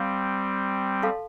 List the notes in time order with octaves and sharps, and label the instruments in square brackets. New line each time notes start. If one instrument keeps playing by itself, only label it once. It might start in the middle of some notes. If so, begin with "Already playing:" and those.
Already playing: [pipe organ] G3 C4 [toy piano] F5
[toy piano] A4 F5 A5 C6